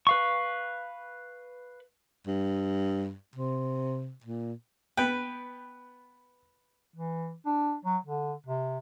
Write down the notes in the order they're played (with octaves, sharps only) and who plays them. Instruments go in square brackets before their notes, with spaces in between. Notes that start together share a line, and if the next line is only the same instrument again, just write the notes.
[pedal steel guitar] B4 F5 C#6
[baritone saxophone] G2
C3
A#2
[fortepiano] B3 G5 [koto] B4
[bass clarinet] E3
D4
F#3
D3
C3